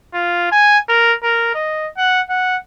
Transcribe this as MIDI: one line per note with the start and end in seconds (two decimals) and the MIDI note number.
0.14 0.48 65
0.52 0.78 80
0.89 1.14 70
1.23 1.50 70
1.54 1.88 75
1.97 2.21 78
2.29 2.57 78